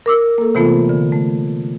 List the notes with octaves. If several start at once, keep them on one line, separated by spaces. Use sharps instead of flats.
A#4 D6 E6
A#3 A4
C3 E3 A3 B3 F4 A4
D3
A3